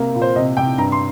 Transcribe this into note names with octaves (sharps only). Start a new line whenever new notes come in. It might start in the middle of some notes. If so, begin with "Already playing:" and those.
Already playing: C3 A#3
A#2
C5
C3 D#5
C3 G5
G2 A#5
C6